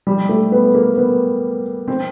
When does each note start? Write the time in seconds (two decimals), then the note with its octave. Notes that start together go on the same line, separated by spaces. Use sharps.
0.07 G3
0.29 A3
0.52 B3
0.75 A#3
0.97 B3
1.88 C4